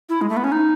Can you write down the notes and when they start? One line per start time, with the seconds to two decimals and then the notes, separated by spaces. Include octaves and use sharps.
0.09 E4
0.21 G#3
0.29 A3
0.37 B3
0.44 C#4
0.52 D#4